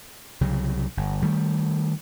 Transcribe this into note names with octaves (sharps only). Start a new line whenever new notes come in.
C2 C#3 F#3
G1
D#3 G3 A3